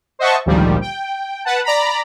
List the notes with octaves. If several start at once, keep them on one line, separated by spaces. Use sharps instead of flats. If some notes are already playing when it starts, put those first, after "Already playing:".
C5 D#5 E5 F#5 A5 C#6
G#1 D2 A#2 D#3 F3 G3
G5
B4 F#5 A5
D5 A#5 B5